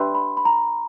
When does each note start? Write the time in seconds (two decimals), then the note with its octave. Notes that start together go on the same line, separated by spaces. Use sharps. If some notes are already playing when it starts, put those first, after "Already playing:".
Already playing: D4 G4 B4 E5 G5 B5 C6
0.15 B5
0.37 B5
0.45 A#5